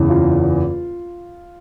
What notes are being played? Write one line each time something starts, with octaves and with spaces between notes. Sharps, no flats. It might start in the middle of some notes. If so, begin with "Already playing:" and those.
Already playing: F#1 E2 C#3 E3
F4